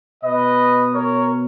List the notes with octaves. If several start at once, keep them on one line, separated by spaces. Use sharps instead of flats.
B2 B4 D#5
A#4 C#5